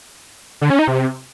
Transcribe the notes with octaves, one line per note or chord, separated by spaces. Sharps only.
D3
C#4
D#4
C3